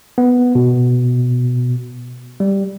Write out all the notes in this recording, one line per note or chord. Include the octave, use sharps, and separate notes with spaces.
B3
B2
G3